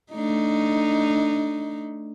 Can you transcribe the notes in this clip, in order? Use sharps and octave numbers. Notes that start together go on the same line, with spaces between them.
A3 D4 D#4